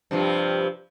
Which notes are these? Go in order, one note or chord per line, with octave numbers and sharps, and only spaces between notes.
G2 C3 F3